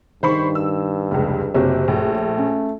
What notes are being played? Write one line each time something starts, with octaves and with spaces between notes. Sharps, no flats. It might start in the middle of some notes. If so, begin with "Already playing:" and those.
G2 D#3 C5 B5 C#6
E6
F1 C#2
F#1 C3 F#4 G4 C#5
A#1 A3
C#4